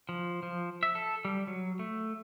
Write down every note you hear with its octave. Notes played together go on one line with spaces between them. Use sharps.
F3
F3
E5
A4
G3
F#3
A3